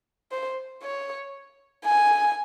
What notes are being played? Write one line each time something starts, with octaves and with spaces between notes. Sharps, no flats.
C5
C#5
G#5